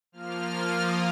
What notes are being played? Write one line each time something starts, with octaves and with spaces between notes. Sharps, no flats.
F3 A#3 F4 F6
D#6